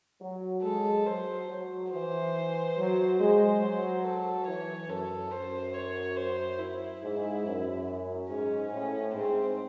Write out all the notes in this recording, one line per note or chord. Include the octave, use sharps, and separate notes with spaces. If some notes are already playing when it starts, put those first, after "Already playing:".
F#3
G#3 A4
F#3 C5
F#3
E3 C5
F#3
G#3 C5
F#3
A4
E3 C#5
F#2 A4
F#2 C5
C#5
C5
E4
G#2
F#2
G#2 C#4
A2 C#4
G#2 C4